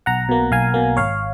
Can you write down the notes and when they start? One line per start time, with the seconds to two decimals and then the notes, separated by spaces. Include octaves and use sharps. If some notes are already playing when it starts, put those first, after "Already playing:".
0.06 B1 F#5 A#5
0.29 B2 A#3
0.51 B1 F5 G#5
0.74 B2 A#3
0.97 G#1 C#5 F5